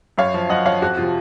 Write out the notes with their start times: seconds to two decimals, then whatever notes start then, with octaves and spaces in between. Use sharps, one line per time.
0.18 F#2 C#5 F5
0.34 F3
0.49 F#2 D#5 F#5
0.66 F3 C#5 F5
0.82 F2 F#4
0.97 C3 F3 F4